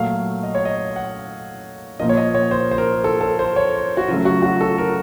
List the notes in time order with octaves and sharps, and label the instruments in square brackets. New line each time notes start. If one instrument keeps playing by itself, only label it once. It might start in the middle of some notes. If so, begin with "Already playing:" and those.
Already playing: [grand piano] A#2 F#3 A3 F5
D#5
C#5
D#5
F#5
A#2 F3 A#3 D#5
C#5
D#5
C#5
C5
C5
A#4
A4
A4
C5
C#5
F#4
C#3 F4
F#3 A3
F#4
F#4
A4
A#4